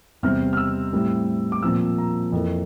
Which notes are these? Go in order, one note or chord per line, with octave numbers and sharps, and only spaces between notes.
E2 C3 G3 C4 F6
F6
E6
A2 G3 C4
D6
A#2 F3 C4 E6
A#5
F2 E3 A#3